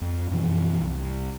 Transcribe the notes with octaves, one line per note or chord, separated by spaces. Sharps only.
F2
F#2 B2 E3 F3
C2